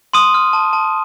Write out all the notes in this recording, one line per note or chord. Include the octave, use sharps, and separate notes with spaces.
C6 D#6 D#7
F6
A5
A5